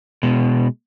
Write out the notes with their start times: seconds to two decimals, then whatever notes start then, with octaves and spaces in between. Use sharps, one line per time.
0.23 B2 G#3